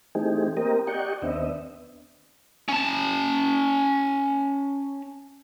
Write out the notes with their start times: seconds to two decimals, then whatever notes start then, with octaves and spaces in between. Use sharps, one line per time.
0.15 E3 A3 C4 D#4 G4 G#4
0.57 A#3 C4 G4 A#4 D#5
0.87 G4 D5 D#5 F#5 G5 C#6
1.22 D#2 B3 C4 D4 D#5 E5
2.68 C#4 A5